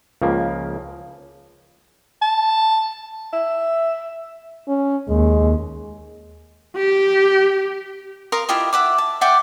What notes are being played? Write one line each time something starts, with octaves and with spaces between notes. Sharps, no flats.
C#2 C#3 F3 A#3
A5
E5
C#4
D#2 G#3
G4
A#4 F5 C6 D#6
E4 F4 G4 D#5
E5 F#5 D6
A5
D5 E5 F#5 G5